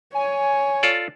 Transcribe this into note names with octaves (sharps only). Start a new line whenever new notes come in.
C#5 G#5
F4 A4 D5